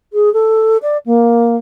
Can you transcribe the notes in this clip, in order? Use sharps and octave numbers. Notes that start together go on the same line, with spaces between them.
G#4
A4
D5
A#3